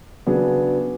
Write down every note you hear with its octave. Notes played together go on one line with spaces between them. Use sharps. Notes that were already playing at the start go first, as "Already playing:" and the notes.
C#3 F#3 B3 D4 G#4